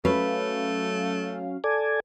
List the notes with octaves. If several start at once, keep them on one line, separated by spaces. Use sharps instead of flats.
F#3 A3 C#4 B4 F5
A4 D5 G#5